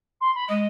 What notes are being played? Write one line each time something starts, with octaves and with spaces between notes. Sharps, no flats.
C6
B5
G#3 D#5